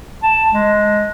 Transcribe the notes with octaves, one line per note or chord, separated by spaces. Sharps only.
A5
G#3